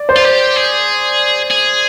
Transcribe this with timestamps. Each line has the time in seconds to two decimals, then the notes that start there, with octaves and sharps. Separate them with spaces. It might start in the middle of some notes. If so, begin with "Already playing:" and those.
Already playing: D5
0.09 C5
0.16 F4
0.25 G4
0.56 G#4
1.51 G#4